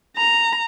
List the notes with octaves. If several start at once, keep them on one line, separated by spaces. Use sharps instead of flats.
A#5